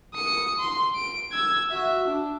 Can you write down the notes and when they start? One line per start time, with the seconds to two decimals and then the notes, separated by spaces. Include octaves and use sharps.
0.14 D#6 C#7
0.60 C6
0.96 D7
1.32 E6 G#6
1.71 F#4 E5
2.07 D4